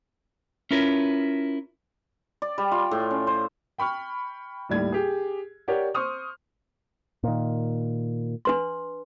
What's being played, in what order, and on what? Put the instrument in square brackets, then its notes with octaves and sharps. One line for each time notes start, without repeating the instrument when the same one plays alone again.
[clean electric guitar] C#4 E4 F4 A#4 B4 C#5
[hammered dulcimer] D5
G3
F4
A2
C#4
C5
[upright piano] G5 B5 C#6 F6
D#2 A2 G3 G#6
G4 G#4
G4 A#4 C#5 D5 F#5
C5 C6 C#6 D#6 F6
[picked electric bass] A#2 D#3
[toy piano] D4 B4 C6